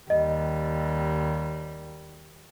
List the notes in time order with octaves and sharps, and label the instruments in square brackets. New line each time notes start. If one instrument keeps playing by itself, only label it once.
[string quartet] D#2 G3 [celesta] D#5